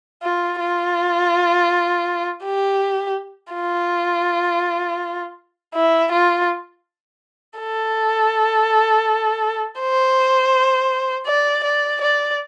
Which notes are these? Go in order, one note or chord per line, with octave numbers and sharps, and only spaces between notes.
F4
F4
G4
F4
E4
F4
A4
C5
D5
D5
D5